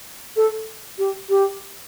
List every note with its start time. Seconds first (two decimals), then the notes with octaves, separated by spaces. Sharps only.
0.36 A4
0.98 G4
1.29 G4